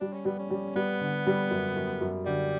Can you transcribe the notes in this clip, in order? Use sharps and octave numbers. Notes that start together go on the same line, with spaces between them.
G3 D4
C#4
G3 B3
C#4
G3
G3 B3
D3
G3
F#2
F#2
F#2
D3 G3